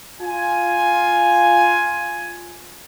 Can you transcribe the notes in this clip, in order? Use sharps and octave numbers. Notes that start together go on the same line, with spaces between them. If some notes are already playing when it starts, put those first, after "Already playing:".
F4 G#5